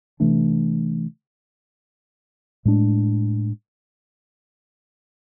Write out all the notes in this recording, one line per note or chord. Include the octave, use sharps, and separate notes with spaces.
C3 E3 A3 D4
A2 G#3 D4